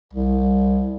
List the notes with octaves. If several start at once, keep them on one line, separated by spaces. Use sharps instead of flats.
C2